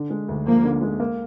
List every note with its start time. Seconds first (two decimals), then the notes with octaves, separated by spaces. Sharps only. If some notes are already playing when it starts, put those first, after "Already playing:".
Already playing: D3
0.10 G#3
0.28 D2
0.46 F3 A#3
0.64 D3
0.81 G#3
1.00 A#3